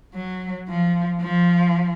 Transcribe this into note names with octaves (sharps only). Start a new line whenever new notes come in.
F#3
F3
F3